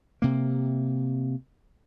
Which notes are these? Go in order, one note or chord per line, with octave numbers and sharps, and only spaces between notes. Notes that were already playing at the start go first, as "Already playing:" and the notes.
C3 A#3